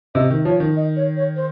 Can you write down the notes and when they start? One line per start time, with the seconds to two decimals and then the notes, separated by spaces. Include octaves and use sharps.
0.15 C3 D#5
0.30 D#3
0.45 F3 C#5
0.60 D#3
0.76 D#5
0.96 C#5
1.17 C#5
1.36 C5